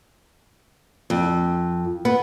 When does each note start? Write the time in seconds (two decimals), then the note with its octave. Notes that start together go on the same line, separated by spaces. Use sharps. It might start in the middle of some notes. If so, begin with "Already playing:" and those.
1.10 F2
2.05 B3